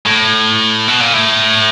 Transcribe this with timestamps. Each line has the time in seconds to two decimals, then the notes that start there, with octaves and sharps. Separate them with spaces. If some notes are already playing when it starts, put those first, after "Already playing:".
0.06 A2
0.88 B2
1.01 A#2
1.14 A2